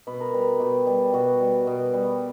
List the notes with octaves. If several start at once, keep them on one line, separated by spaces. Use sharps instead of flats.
B2 B4
A#4
G3 B4
B2 G4
G3
B2 F#4
G3
B2
G3